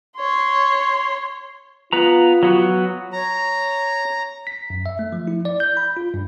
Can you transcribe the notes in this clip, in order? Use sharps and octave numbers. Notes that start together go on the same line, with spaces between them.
C#5 C6
B3 F4 B4 A#5
F#3 B3 F#4
C#5 A#5
B6
F#2
E5
A3
F3
E4
D5
G6
B5
F4
G2